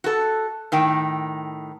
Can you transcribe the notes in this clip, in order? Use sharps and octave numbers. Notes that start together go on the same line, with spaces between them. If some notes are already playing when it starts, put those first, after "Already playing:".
F#4 A4
A2 D#3 G5